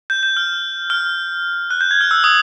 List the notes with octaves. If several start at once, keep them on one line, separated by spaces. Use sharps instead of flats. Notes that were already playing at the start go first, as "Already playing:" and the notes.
G6
G6
F6
F6
F#6
G6
G#6
F6
E6
D#6